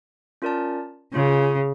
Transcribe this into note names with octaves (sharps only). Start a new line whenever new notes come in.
C#4 F4 A#4 D5 A5
C#3 C#4 F4 C#5